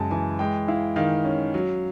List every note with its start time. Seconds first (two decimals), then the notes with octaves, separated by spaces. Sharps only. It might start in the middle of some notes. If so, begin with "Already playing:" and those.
Already playing: F#2 C#3 G#3 A5
0.11 E3 G#5
0.39 G#3 G5
0.68 E4 F5
0.96 D#3 F5
1.25 C#4
1.54 F#3